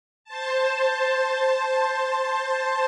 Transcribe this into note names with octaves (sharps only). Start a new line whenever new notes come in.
C5 A5